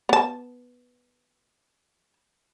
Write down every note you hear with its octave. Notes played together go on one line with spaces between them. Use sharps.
B3 A5